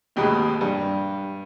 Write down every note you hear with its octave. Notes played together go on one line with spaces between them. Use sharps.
A1 D#2 B2 G#3 D#6
G2